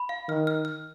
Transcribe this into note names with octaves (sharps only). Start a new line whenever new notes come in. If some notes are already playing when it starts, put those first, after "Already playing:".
Already playing: B5
F5
D#3 F6
F6
F6